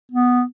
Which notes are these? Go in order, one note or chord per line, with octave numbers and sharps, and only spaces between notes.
B3